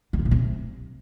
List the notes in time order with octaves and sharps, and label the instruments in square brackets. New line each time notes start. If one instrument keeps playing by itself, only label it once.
[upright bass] D3
G#2
A#2
C3